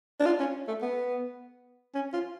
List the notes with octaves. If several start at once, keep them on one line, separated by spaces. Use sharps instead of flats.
D4
F4
C#4
A3
B3
C#4
F4